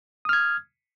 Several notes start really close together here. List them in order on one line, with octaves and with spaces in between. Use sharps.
D#6 F6 G#6